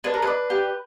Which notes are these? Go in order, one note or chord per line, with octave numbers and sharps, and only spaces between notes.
D4 B4
A#4
D4 B4
G4